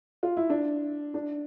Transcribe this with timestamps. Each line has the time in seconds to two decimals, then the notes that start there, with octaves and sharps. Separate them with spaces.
0.23 F4
0.37 E4
0.50 D4
1.14 D4